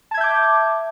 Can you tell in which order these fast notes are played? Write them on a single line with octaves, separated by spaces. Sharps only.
A5 G#6 E5 G6 D6